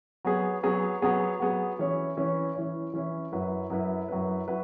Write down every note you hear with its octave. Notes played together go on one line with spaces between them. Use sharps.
F#3 B3 G#4
F#3 B3 G#4
F#3 B3 G#4
F#3 B3 G#4
E3 C#4 E4 C#5
E3 C#4 E4 C#5
E3 C#4 E4 C#5
E3 C#4 E4 C#5
F#2 F#3 E4 B4
F#2 F#3 E4 B4
F#2 F#3 E4 B4
F#3 E4 B4